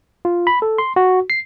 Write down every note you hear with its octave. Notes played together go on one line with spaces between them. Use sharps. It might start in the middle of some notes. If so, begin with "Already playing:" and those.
F4
B5
A4
C6
F#4
C7